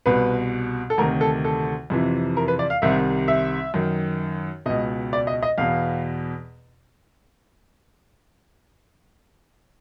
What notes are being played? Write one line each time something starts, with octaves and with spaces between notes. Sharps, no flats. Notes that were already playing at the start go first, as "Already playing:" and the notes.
C2 B2 B4
A4
D2 C3 D#3 A#4
A4
A4
F2 C3 E3
A#4
B4
D5
F5
C2 C3 D#3 E5
E5
F#2 D#3
C#2 B2 D#5
D5
D#5
D#5
E2 B2 F5